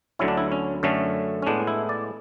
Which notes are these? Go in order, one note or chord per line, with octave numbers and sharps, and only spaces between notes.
D2 D3 F#3 C#4 E4
D4
E4
C#4
F#2 D3 A3 C#4
C#4
A2 G#3 B3 D4
E4
D5